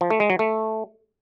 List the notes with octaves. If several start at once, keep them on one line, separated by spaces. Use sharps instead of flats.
F3
A3
G#3
F#3
A3